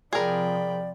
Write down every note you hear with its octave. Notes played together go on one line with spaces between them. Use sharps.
C3 F3 G#4 A#4 D5 G5 B5